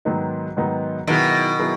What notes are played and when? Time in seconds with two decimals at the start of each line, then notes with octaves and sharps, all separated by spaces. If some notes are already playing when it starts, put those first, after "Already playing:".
0.05 G#2 D#3 F#3 B3 D#4
0.57 G#2 D#3 F#3 B3 D#4
1.07 B2 D#3 F#3 B3 E4 G#4
1.59 F#3 B3 E4 G#4